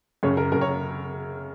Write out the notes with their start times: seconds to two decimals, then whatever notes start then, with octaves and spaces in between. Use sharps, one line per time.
0.23 F#2 C#3 C#5
0.37 A#4
0.52 F#2 C#3 A#4
0.61 C#5